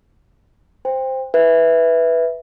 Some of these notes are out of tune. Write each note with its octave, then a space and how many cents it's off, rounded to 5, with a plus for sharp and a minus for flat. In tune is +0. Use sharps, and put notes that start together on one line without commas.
C5 +0 G5 +25
B4 +0 E5 +0